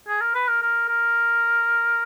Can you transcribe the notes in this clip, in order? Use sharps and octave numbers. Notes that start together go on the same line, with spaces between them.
G#4
A#4
B4
A#4
A#4
A#4